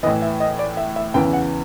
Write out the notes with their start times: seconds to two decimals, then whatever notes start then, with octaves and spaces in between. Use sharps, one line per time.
0.03 A2 E3 D#5
0.22 E5
0.40 D#5
0.59 D5
0.77 E5
0.96 E5
1.14 E2 C#3 E3 G5
1.33 F#5